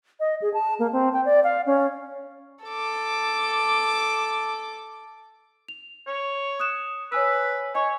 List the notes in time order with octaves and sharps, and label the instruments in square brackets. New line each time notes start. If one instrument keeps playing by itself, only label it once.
[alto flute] D#5
G#4
A5
A#3
C4
G5
D5
F5
C#4
[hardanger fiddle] A4 D6
[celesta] F7
[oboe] C#5
[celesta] D#6 F#6 E7
[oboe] B4 [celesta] C#5 G#5 E6
[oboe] C#5 [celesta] D#5 G#5 C#6